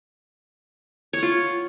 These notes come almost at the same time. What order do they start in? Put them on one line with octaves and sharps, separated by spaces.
C#5 F#5 F4